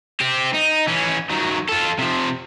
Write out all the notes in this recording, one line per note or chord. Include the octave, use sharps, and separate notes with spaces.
C4 G4
D#4
E3 C#4
D#3 F#3
F4 A4
C3 F3